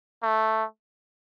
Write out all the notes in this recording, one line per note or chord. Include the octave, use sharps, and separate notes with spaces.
A3